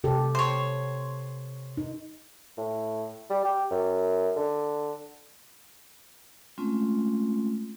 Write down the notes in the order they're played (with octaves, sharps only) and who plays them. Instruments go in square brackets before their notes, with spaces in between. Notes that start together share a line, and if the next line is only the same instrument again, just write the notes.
[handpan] C3 G4 A4
[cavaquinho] C5 C#5
[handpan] D#4
[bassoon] A2
G3
G4
F#2
D3
[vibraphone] G#3 A3 C4 C#4 F4